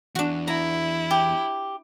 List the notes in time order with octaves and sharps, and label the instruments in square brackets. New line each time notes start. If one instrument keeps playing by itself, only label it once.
[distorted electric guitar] E2 [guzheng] D4 F#4
[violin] E4 [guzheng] A#5
[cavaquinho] G4